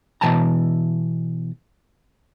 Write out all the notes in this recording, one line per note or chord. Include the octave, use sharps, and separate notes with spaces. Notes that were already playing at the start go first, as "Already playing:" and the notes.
B2 E3 G5 A5 A#5